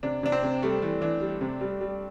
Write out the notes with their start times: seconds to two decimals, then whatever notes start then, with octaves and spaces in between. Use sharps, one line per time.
0.03 C3 D4
0.23 C3 D4
0.32 C4
0.43 C3
0.62 G3 A3
0.82 E3 A3
1.01 E3 D4
1.21 G3
1.41 C3
1.61 G3
1.81 G3